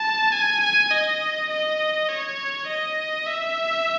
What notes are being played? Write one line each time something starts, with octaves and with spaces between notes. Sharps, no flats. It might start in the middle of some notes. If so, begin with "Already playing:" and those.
Already playing: A5
G#5
G#5
D#5
D#5
C#5
D#5
E5